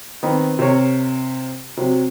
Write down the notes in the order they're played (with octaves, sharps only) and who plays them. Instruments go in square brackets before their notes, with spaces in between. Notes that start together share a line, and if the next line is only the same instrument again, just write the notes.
[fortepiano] D#3 B3 C4
C3 A#4 C#5
C3 F#3